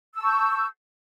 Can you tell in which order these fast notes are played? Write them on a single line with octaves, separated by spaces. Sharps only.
E6 A5 C#6 G6